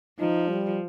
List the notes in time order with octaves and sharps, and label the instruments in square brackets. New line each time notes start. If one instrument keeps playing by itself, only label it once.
[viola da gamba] F3 [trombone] D#4
[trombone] G3